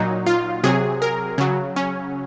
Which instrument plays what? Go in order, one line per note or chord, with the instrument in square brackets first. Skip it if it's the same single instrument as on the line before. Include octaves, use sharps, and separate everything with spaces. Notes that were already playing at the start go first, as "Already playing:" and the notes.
Already playing: [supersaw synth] A#2 F#3 D#4
F4
C3 F#3 G#4
A#4
C#3 F#3
C#4